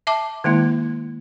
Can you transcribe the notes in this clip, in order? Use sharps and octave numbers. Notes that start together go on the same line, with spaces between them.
E5 A5 D6
D#3 G#3 A#3 E4